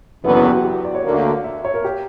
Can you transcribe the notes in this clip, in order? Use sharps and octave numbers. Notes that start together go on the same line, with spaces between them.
F#1 E2 D3 F#3 B3 E4
F#4
G4
F#4
G4
D5
C#5
D2 D3 A#3
E5
C#5
A#4
G4